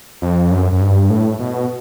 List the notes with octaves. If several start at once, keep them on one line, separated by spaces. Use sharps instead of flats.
F2
F#2
F#2
G2
A2
B2